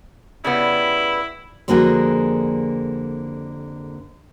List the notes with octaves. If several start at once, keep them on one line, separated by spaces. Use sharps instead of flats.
C#3 G3 B3 E4
F2 D3 G3 A#3 F#4 G#4